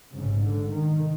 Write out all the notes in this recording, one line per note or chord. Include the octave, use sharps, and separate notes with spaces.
A1 G#2 C#3
D3
D#3